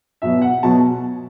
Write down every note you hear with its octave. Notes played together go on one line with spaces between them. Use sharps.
B2 F#3 B3 E5
F#5
B2 F#3 B3 A5